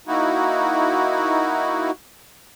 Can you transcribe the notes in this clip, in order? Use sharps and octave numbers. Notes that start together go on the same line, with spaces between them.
A#3 D#4 E4 F#4